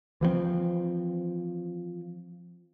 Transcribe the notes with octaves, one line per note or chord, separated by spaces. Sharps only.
E3 F3 G#3 C4